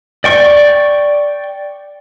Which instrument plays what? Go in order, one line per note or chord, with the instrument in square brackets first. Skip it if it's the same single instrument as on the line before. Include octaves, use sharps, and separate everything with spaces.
[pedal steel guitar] D5 G5 C#6